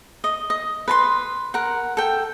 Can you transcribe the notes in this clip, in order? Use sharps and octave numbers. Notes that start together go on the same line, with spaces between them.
D#5
D#5
B4 A5 C6
A#4 F#5
A4 G5